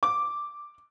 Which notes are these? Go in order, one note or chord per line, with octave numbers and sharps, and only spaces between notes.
D6